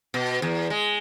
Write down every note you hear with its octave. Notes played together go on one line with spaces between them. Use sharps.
B2
E2
G#3